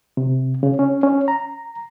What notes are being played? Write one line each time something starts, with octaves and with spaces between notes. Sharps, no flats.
C3
C#3
C#4
C#4
A#5